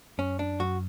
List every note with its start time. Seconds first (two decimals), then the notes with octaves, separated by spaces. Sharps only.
0.18 F#2 C#4
0.39 D4
0.60 F#2 F#4